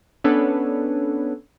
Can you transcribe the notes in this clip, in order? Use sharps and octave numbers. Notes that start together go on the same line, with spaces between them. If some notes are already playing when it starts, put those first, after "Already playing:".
B3 C#4 D4 A4 B4 C#5